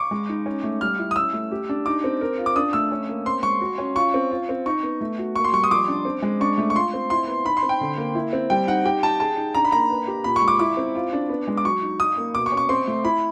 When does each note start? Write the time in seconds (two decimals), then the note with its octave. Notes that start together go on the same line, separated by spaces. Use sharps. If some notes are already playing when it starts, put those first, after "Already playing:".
Already playing: C#6 D6
0.11 G#3
0.29 D#4
0.46 C#4
0.63 A3
0.81 G3 F6
0.99 E4
1.11 D#6
1.16 C#4 E6
1.33 A3
1.51 G4
1.69 D4
1.86 D#4 D6
2.04 C4
2.21 A#4
2.38 F4
2.46 D6
2.56 D4 D#6
2.73 A3 E6
2.92 C#4
3.09 A#3
3.25 C4 C6
3.43 G#3 C#6
3.61 F#4
3.78 C#4
3.95 F4 C#6
4.14 C4
4.31 F4
4.49 C4
4.66 D#4 C#6
4.83 B3
5.01 A3
5.18 F#4
5.36 A#3 C#6
5.44 C6
5.53 G3 C#6
5.64 D#6
5.71 F3 D6
5.88 D4
6.05 C4
6.22 G#3
6.40 D4 C#6
6.58 A3
6.70 C#6
6.75 F4 C6
6.94 C4
7.10 E4 C6
7.27 B3
7.45 D#4 B5
7.57 C6
7.63 C4
7.69 G5
7.81 D3
7.97 A#3
8.15 E4
8.33 C4
8.50 G3 G5
8.68 D#4 F#5
8.85 G4 G5
9.03 D#4 A5
9.20 G#4 A5
9.37 D#4
9.55 D4 A#5
9.65 B5
9.72 A#3 A#5
9.90 B4
10.07 G4
10.24 A#2 B5
10.36 C#6
10.42 G#3
10.48 D6
10.59 E4 D6
10.77 C4
10.95 F4
11.13 D4
11.29 B3
11.48 G#3
11.57 D6
11.65 F#3 C#6
11.82 D#4
12.00 D#4 D#6
12.17 A#3
12.35 B2 D6
12.46 C#6
12.52 C#4
12.57 C#6
12.69 C4 C6
12.88 A3
13.04 E4 B5